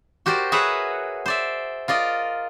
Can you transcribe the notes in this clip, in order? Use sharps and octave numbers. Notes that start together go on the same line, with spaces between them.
F#4 G4 A#4 C5 D5
G#4 A#4 B4 C#5 E5 F#5
C5 D5 E5
F4 A#4 D5 D#5